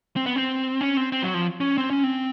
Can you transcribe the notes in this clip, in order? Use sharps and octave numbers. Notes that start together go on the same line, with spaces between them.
C4
B3
C4
C#4
C4
C4
F#3
F3
C#4
C4
C#4
C4